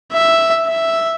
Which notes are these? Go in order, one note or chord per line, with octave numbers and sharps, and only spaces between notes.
E5
E5